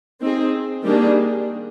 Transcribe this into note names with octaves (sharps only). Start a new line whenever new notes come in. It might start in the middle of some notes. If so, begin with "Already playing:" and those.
C4 D#4 G#4
D#3 G3 A#3 D4 G#4